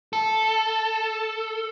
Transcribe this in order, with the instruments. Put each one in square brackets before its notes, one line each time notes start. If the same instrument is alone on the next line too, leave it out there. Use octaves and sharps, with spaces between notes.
[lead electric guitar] A4